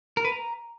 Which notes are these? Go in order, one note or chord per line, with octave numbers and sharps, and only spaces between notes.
A#4
B4
A#5